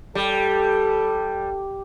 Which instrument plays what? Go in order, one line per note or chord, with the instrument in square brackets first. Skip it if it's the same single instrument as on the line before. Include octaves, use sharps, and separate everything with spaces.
[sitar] G3 [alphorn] A4